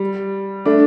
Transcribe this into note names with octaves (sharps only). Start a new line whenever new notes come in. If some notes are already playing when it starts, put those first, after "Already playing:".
Already playing: G3
A3 D4